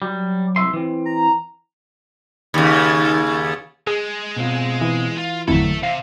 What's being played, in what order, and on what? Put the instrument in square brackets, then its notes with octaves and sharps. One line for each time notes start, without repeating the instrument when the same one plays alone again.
[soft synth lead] F#3 [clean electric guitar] G3
[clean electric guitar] C2 E5 C6
E3 C4
[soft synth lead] A#5
[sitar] D#2 C#3
[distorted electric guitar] G#3 [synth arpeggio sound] G#4
[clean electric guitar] B2 C4 F4
[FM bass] E3
[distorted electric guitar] F4
[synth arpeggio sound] G#1 F2 E4 [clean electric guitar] D3 F#3 A3 [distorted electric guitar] A4 E5
[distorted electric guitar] C3 [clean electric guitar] F5